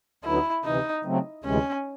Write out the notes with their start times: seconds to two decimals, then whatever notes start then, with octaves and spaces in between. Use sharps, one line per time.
0.24 D2 D3 F#3 B3 D#4 E4
0.64 D2 C3 E3 D#4
1.05 C#3 F#3 A3 C4
1.44 D2 C3 E3 G#3 C#4